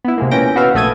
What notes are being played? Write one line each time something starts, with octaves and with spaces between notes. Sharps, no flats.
B3 E4
C3 G#3 A#3
A#2 E3 C#4 G5 A#6 D7
B3 F#4 B4 E5 F5
A#1 A3 A4 D#6 G#6 D#7